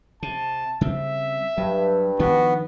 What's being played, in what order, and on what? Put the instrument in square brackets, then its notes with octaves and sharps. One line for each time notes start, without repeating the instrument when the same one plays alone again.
[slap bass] C3 [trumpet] A5
[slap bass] C#3 G3 C4 [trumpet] E5
[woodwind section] G2 [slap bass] F#3
[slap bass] D#3 F3 D4 [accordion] B3 [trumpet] F#4